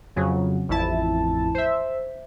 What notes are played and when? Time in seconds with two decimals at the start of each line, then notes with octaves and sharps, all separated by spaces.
0.16 F2 C#3 F#3
0.69 A1 F2 E4 A5
1.54 C5 E5